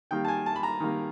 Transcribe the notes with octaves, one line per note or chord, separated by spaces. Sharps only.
D#3 G3 A#3 G5
A5
G#5
A5
B5
A#5
D#3 G3 A#3